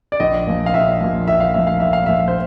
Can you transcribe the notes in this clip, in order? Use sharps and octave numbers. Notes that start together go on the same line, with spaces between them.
D5
A#1 D#5
A#2 F3
F5
A#1 E5
A#2 F3
A#1 E5
F5
A#2 F3 E5
F5
A#1 E5
F5
A#2 F3 E5
C5